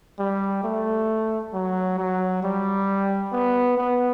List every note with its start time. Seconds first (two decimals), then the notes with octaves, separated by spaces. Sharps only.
0.19 G3
0.64 A3
1.53 F#3
1.98 F#3
2.43 G3
3.32 B3
3.77 B3